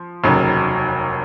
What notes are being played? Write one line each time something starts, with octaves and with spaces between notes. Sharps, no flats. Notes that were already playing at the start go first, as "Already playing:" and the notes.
Already playing: F3
F1 D#2 C#3 F#3